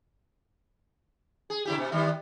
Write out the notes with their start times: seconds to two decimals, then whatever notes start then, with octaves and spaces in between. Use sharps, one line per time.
1.50 G#4
1.65 C#3 E4 G4
1.78 B2
1.92 D#3 G3 B3